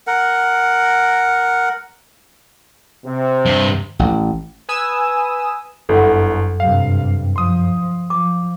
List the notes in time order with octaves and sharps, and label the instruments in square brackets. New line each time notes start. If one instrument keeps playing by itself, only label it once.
[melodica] A#4 F#5
[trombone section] C3 C4
[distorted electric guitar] G2
[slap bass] A1
[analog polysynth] B4 G#5 D#6 E6
[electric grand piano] G1 E4 [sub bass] F#2 [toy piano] A4 F#5
[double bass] G2 C3 [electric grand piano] F5
[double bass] F3 [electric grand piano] C6 D#6
[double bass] F3 [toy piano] D6